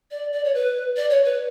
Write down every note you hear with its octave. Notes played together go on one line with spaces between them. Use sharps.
D5
D5
C#5
B4
D5
C#5
B4